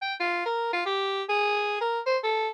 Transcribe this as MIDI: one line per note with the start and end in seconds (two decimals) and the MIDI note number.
0.02 0.14 79
0.20 0.44 65
0.46 0.69 70
0.73 0.82 65
0.86 1.23 67
1.29 1.77 68
1.81 2.00 70
2.06 2.18 72
2.23 2.49 69